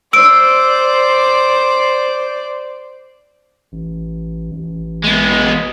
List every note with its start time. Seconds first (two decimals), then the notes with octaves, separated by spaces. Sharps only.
0.13 C5 D5 E6 D7
3.72 A1
4.51 A1
5.04 G#3 B3